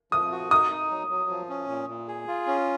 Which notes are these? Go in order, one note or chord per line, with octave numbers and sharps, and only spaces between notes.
F3 D#6
F#4
D#4 D#6
D#4
F#3
F#3
F3
C#4
A#2
A#2
G#4
F4
C#4